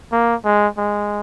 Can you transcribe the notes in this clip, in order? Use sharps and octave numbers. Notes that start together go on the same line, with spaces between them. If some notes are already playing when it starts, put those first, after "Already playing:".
A#3
G#3
G#3